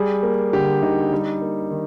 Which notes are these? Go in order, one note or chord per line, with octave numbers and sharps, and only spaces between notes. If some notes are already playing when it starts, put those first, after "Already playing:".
Already playing: G3 G#4
A#3
D3 G4
D3 D#4
G3
A#3
D#3